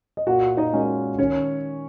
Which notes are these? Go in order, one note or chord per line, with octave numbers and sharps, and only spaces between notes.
D#5
A#2 F#4 F#5
D#4 D#5
G#3 C#4 F#4 A#4
D#3 C#4 C#5